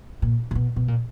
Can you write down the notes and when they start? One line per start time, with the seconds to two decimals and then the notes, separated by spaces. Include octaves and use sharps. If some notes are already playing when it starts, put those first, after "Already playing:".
0.22 A#2
0.51 C3
0.55 B2
0.76 B2
0.88 A#2